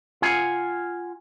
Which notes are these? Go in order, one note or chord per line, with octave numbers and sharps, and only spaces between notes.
F4 F#5 G#5